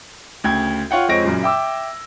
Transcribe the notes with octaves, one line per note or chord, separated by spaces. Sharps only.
D2 C#3 G5 G#6
F4 C#5 F#5 G5
F2 G#3 C4 C#5 A#6 D7
F#2 A#2 C#3
E5 G5 D6 E6